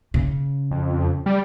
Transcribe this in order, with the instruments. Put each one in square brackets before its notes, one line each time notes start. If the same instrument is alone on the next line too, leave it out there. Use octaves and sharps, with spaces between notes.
[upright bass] C#3
[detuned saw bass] F2
G3